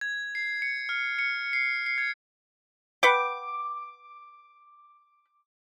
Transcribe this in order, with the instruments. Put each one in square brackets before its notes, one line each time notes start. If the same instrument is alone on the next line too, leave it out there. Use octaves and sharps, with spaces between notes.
[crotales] G#6
C7
C#7
F6
C#7
C7
C7
G#6
[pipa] B4 F#5 G5 [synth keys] D6